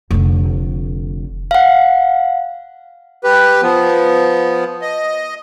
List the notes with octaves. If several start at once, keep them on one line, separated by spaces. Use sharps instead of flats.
F1 D3
F5 F#5
G4 B4
F3 B3
D#5